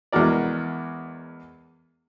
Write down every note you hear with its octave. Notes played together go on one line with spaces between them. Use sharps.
E2 G#3 F#4 A#4 D5